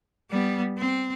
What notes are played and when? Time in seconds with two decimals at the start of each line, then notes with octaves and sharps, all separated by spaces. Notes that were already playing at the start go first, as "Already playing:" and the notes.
0.31 G3 B3
0.78 C4